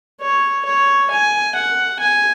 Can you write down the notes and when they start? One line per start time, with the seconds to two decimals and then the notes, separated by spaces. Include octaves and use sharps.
0.20 C#5
0.65 C#5
1.11 G#5
1.55 F#5
1.99 G#5